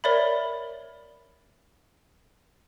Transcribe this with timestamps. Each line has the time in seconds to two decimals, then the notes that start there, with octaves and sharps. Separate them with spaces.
0.04 A#4 C#5 D5 E5 B5